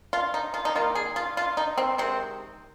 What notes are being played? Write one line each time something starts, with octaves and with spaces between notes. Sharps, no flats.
F4
D#4
F4
D#4
D#3 A#3 F4
G#4
F4
F4
D#4
C4
C3 D#3 G#3 C4